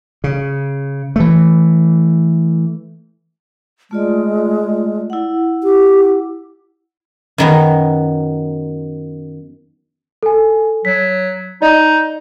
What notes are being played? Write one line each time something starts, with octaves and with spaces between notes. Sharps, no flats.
C#3
E3 A3
G#3 A3 F4 D5
E4 F#5
G4
F#2 D#3 B3
A4 G#5
F#3 B6
D#4 D5 D#5